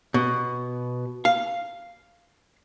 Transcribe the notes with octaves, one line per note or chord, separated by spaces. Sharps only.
B2
F5